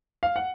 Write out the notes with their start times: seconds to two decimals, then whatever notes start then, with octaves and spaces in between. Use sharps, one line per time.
0.23 F5
0.36 F#5